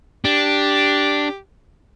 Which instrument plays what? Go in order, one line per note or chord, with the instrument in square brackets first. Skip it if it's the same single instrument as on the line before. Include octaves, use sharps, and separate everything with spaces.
[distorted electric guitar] D4 [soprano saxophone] G4